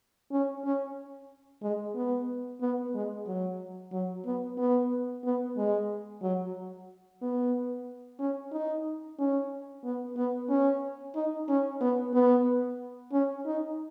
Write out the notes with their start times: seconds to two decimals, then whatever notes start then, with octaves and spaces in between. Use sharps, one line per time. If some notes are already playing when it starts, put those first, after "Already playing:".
0.31 C#4
0.64 C#4
1.62 G#3
1.95 B3
2.61 B3
2.94 G#3
3.27 F#3
3.92 F#3
4.25 B3
4.58 B3
5.24 B3
5.57 G#3
6.22 F#3
7.22 B3
8.19 C#4
8.52 D#4
9.19 C#4
9.84 B3
10.17 B3
10.49 C#4
11.15 D#4
11.49 C#4
11.81 B3
12.14 B3
13.12 C#4
13.46 D#4